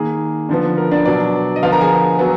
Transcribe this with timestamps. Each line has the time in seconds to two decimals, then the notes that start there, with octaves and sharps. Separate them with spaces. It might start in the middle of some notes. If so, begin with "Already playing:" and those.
Already playing: D#3 A#3 G#4
0.49 D3 F3 B3
0.78 A#4
0.91 D4 D5
1.06 B2 F#3 B3 D4 D5
1.56 D#5
1.62 D3 F3 B3 F4 F5
1.72 A#4 A#5
1.81 G#4 G#5
2.19 F#3 B3